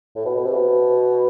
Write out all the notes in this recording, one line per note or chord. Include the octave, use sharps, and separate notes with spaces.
A2
B2
B2
C3
B2